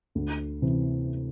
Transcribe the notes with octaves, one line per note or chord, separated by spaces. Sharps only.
D2
C3 E3